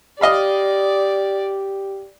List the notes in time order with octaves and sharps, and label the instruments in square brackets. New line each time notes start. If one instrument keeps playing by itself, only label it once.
[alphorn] G4 [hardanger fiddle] D5 [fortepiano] D#5 F5 B5